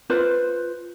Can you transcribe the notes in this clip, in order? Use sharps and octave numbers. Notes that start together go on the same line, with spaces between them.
F4 B4 C5